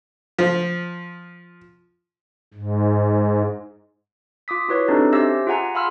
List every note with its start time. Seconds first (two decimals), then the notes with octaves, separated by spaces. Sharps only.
0.39 F3
2.54 G#2
4.48 F4 D6 D#6 B6
4.68 E4 F#4 B4 C#5
4.88 C4 D4 D#4 G4 A4
5.13 C#4 G4 C5 E5 E6 A#6
5.47 F4 G#4 F#5 G#5 A#5
5.75 F5 B5 C6 E6 F6